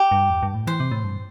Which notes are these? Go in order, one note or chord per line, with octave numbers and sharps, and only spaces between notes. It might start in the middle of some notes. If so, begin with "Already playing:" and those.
Already playing: G4
G2
E2
G2
A2
E3 C5
C3
A2
G2